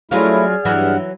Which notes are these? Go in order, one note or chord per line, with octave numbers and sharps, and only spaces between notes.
F#3 A3 C#4 E4 F4 G#4 D5 F6
G2 E3 F#3 E4 F#5